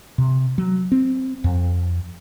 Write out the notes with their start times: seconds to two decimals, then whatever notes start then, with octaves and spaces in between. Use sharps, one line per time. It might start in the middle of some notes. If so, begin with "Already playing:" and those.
0.18 C3
0.58 F#3
0.92 C4
1.44 F2